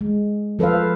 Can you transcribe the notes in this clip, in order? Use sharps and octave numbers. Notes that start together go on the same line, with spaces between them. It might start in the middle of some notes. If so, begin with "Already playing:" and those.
G#3
F3 A4 B4 C5 F5